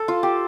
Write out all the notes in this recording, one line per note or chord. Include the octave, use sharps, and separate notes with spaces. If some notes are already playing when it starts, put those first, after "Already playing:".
Already playing: A4
F4
G4